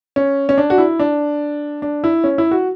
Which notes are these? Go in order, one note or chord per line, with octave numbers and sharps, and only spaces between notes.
C#4
C#4
D4
F#4
E4
D4
D4
E4
C#4
E4
F#4